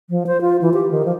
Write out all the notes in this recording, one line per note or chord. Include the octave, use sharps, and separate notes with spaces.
F3
C5
F4
E3
G4
D#3
F3